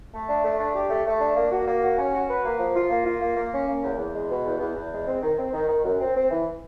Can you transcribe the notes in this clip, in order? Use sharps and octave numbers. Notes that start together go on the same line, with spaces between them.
A3
D4
A3
D4
G4
A3
A3
D4
A#3
F#4
A#3
F#4
C#4
F#4
B4
A#3
F3
F4
A#3
F4
A#3
A#3
C#4
A#3
E2
E2
G#3
B2
E2
E2
E2
G#3
C4
D#3
C4
D#3
D#3
F#2
C4
C4
E3